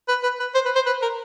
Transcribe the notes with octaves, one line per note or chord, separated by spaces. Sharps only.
B4
B4
B4
C5
B4
C5
B4
A#4